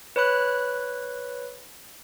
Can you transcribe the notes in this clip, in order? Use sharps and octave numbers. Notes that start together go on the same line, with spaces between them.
B4 C#5 B5 F#6